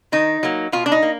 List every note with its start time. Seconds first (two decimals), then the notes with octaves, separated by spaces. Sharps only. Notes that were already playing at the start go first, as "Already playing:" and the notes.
0.12 D#3 D#4
0.43 F#3 A#3
0.72 B2 F4
0.86 D4
0.92 D#4
1.02 A#3